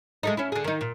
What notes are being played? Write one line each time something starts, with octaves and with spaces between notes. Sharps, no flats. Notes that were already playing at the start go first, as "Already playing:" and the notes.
G#3 A3 D#4
C#4 E4
D3 G#4
D#3 D#4
A#2